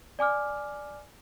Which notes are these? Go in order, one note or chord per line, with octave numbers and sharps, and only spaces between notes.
D5 G#5 D6 F6